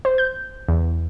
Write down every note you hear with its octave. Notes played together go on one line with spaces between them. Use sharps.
C5
G6
E2